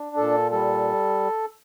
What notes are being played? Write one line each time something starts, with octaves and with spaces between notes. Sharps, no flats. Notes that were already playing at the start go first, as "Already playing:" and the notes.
Already playing: D4
A#2 A4
G3 A4